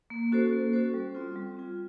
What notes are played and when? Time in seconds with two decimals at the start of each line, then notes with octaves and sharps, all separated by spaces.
0.10 A#3
0.32 C#4 F#4 A4 C5
0.53 A#3
0.73 C#4 F#4 A4 C5
0.94 G3
1.15 C4 F4
1.36 G3
1.57 C4 F4